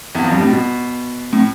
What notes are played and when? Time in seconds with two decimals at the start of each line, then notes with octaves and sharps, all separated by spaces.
0.15 E2
0.24 F2
0.32 G2
0.41 A2
0.50 B2
1.33 A2